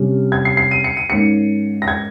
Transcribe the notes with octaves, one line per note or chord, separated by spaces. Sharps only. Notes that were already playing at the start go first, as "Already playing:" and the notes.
Already playing: C3 G3 C#4
G#6
C7
C7
D#7
C#7
D#7
G#2 D#3 A#3 C#4 C#7
A#6
G#6